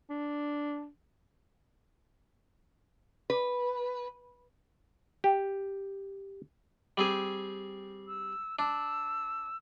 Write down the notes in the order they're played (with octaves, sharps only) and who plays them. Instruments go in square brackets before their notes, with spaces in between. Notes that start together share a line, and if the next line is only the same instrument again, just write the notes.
[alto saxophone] D4
[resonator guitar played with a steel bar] B4
[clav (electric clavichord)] G4
[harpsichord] G3 C4 G#4
[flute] E6
[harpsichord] D4 [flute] E6